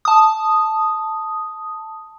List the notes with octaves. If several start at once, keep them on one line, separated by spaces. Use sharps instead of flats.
A5 D#6